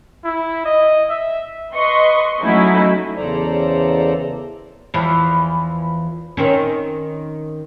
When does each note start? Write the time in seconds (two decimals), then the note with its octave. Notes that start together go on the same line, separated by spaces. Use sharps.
0.25 E4
0.65 D#5
1.10 E5
1.75 B4 D#5 C6 C#6
2.41 F#3 A3 C#4 D#4 E4 F#4
3.17 E2 C#3 A4 C5 D5 A#5
4.94 E2 E3 F3
6.37 D#3 C4 C#4